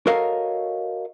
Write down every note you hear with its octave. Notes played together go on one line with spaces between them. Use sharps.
F#4 A4 A#4 C#5 D#5 F5